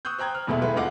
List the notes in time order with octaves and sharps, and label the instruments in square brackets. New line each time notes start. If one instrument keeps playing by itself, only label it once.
[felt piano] C#6 D#6 E6 F#6 G6
C5 G5 A#5 F#6 G#6
F6
E2 B2 G#3 A3 B3 E4
G#3 A3 E4 G4 B4
D2 F4 D#5 F5 F#5 D6